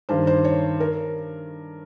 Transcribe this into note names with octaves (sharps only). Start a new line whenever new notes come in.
G2 D#3 C5
C5
C#5
A#4